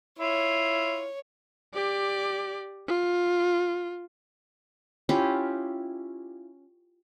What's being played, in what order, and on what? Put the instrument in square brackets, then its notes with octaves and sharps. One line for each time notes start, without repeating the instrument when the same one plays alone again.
[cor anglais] E4 [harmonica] F4 [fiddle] C#5
[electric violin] G4 D5
F4
[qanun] C#4 E4 F4 G4